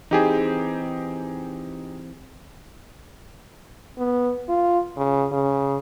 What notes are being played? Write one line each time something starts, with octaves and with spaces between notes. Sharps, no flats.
E3 C4 D#4 G4 G#4
B3
F4
C#3
C#3